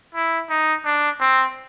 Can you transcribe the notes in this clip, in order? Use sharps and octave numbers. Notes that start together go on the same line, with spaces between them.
E4
D#4
D4
C4